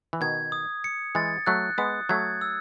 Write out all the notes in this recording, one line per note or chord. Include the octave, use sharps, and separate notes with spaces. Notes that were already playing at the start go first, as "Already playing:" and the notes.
E3
B2 D#3 G#6
D#6
C#7
E3 G#3 A6
F#3 A3 F#6
G#3 B3 D#6
F#3 A3 G#6
E6